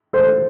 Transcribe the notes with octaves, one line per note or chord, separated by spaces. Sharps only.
A4 C5